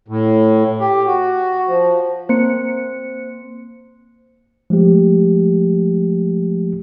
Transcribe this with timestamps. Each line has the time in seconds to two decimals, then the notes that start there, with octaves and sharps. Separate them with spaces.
0.08 A2
0.80 G4
1.07 F#4
1.68 F3
2.29 A#3 C4 C5 C#7
4.70 F3 G#3 A3 G4